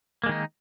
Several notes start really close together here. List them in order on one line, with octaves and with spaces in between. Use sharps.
A#3 G#3 D#3 D#4